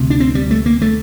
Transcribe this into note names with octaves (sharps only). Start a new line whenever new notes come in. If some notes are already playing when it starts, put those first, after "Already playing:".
Already playing: D2 C3
D4
C4
G3
A3
A#3
A3